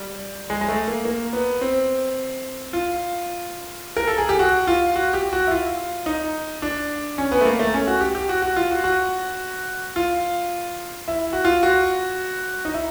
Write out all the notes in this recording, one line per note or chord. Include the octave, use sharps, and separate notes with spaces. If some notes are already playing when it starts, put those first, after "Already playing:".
Already playing: G3
G#3
G#3
A3
A#3
A#3
B3
C4
F4
A#4
A4
G#4
G4
F#4
F4
F#4
G4
F#4
E4
F4
D#4
D4
C#4
B3
A3
A#3
A3
C#4
F#4
G4
G4
F#4
F#4
F4
F#4
F#4
F4
E4
F#4
F4
F#4
D#4
E4